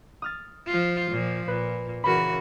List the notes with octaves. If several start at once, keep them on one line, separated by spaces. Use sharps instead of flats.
D#6 F6 A6
F3 F4
A#2 F3
A#2 B4
C#3 E3 F#4 A#4 B5